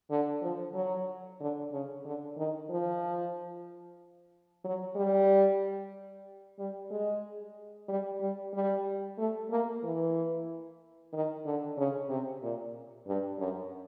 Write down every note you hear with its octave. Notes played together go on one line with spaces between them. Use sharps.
D3
F3
F#3
D3
C#3
D3
D#3
F3
F#3
G3
G3
G#3
G3
G3
G3
A3
A#3
E3
D#3
D3
C#3
C3
A#2
G2
F#2